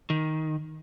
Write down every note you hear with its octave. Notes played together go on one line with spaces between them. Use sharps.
D#3